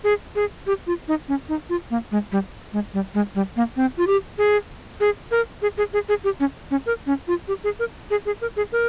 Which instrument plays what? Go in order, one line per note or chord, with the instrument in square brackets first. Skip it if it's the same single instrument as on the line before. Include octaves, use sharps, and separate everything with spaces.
[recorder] G#4
G#4
G4
F4
D#4
C#4
D#4
F4
A#3
G#3
G3
G#3
G3
G#3
G3
A#3
C4
F4
G4
G#4
G#4
A#4
G#4
G#4
G#4
G#4
G4
C#4
C#4
A#4
C#4
F4
G4
G#4
A#4
G#4
G#4
A#4
G#4
A#4